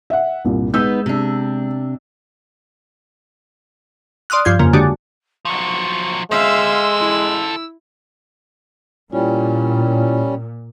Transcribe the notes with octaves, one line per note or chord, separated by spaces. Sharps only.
E5 F#5
C2 G2 A#2
G#3 B3 D#4 B4 E6 G6
C3 D4
D5 C6 D#6 F6 F#6
G2 F3 F4 G6 G#6
F2 C#3 A#3
D3 G#3 D4 F#4 G4
F3 F#3 C#6
G#3 A4 C5 E5 F5 E6
E4
A#2 G3 C#4 E4 F4